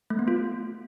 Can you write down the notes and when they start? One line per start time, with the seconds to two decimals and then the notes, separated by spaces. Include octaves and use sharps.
0.10 A3
0.19 B3
0.28 F4